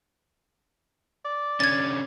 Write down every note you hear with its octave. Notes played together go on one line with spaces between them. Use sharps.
D5
D3 C#4 G#6 A6